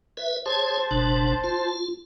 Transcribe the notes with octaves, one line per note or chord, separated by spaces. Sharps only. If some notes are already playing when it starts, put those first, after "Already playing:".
B4 E5
G#4 C5 C#5 A5
F#1 B2 D4
F4